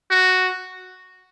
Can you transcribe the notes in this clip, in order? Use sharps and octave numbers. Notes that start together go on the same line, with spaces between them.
F#4